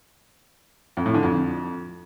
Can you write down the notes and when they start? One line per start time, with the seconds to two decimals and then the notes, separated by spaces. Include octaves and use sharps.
0.97 F2
1.06 A2
1.14 D3
1.23 F2